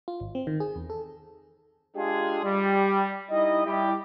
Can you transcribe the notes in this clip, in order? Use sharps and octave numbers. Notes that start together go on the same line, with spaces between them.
F4
G#1
C4
D#3
G#4
E2
A4
G#3 D4 F4 G4 G#4
G3
G3 D#4 E4 D#5
G3 E4 G4